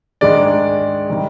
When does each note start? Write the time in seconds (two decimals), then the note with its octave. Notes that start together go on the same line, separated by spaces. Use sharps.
0.21 G#2 D#3 G#3 D4 D5
1.09 C3 D#3 G3